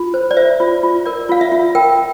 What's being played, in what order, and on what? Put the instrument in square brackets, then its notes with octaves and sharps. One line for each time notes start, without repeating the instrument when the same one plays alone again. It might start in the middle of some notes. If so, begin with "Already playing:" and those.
Already playing: [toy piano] F4
C5
D5
C5 E5
F4
F4
A#4 D5
F4 F5
E5
F4
A#4 G5